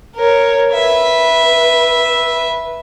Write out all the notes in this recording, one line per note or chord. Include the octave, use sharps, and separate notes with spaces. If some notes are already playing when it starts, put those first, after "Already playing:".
A#4 C#5
B4 E5